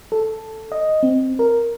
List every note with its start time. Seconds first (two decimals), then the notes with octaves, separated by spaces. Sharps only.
0.12 A4
0.72 D#5
1.03 C4
1.39 A#4